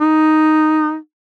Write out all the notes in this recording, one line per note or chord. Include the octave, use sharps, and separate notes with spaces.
D#4